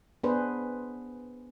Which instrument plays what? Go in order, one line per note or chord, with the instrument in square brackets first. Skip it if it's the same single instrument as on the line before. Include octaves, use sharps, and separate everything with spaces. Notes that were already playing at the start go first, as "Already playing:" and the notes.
[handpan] B3 D4 G#4 B4 C5